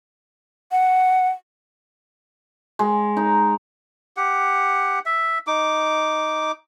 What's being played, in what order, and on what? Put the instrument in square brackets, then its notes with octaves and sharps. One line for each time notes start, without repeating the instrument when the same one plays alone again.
[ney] F#5
[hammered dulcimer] G#3
D#4
[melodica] G4 F#5
E5
D#4 D6